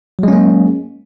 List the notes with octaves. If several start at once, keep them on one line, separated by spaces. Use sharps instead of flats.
F#3 G#3 A#3 C#4